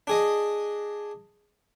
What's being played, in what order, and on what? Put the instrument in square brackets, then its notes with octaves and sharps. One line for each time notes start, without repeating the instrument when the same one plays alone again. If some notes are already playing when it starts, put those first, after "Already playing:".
[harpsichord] D4 G#4 D#5